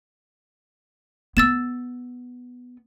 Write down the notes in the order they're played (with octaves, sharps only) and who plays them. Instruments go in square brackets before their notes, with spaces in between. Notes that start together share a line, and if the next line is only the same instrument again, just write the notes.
[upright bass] B3 [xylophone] E6 A6 E7